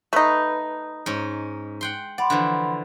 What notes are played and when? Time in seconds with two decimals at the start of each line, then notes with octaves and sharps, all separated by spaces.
0.13 A3 D#4 B4
1.06 G#2 C#4
1.81 F#5 G5 C6
2.18 D5 F#5 B5 C6
2.30 D3 E3 F3